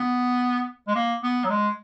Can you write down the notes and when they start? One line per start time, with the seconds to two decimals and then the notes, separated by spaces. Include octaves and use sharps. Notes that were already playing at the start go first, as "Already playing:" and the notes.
Already playing: B3
0.88 G#3
0.95 A#3
1.23 B3
1.44 F#3
1.50 G#3